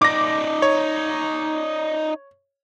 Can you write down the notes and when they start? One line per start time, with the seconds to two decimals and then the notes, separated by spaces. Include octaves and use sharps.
0.02 D#4 D5 D6 A#6
0.62 C#5